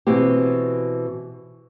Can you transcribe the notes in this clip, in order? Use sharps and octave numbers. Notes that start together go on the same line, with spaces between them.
B2 E3 C4 G4